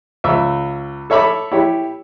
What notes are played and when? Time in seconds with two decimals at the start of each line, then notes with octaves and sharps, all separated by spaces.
0.24 C#2 E5
1.10 A4 C#5 E5 B5 D6
1.52 E4 G4 C#5